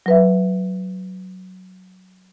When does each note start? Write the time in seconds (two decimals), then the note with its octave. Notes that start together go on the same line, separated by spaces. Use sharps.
0.06 F#3 B4 E5